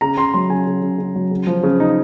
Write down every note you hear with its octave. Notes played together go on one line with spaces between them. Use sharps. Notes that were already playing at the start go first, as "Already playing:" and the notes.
C#3 A#5
C#3 C6
F#3 C6
C#3 G#5
C#3
C#3
C#3
F#3
C#3
F3
C#3
D#4